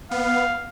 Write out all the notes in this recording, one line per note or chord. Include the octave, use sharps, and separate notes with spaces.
B3 F5